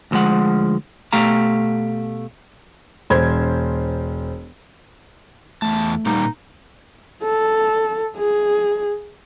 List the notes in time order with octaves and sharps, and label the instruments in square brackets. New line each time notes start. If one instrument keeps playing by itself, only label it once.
[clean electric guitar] D2 A#2 F3 G#3 F#5
B2 A3 G4 F5 A#5
[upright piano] E1 C5 G#6
[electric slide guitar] E2 A5 [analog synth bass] A3
[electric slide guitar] A#2 G3 A#3 [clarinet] D#4
[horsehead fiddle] A4
G#4